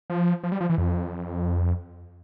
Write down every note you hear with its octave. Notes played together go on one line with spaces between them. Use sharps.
F3
F3
G3
F3
E3
F2